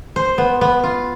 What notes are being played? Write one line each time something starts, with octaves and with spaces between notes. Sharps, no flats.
C5
B3
B3
F4